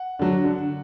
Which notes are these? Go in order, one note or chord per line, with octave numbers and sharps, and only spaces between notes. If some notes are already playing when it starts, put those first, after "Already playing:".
Already playing: F#5
D3 F#3
D3